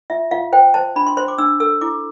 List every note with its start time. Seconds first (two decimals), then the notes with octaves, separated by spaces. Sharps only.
0.10 F4 E5
0.31 F4 F5
0.53 C5 G5
0.74 C5 A5
0.96 D4 B5
1.07 C6
1.17 C5 C6
1.28 D6
1.38 D4 E6
1.60 A4 E6
1.81 E4 D6